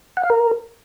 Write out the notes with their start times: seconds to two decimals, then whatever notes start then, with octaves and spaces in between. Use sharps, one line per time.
0.17 F#5
0.23 F5
0.30 A#4